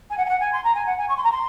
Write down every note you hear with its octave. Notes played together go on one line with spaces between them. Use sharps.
G#5
F#5
G#5
F#5
G#5
C6
A#5
G#5
F#5
G#5
C#6
C6
A#5
C6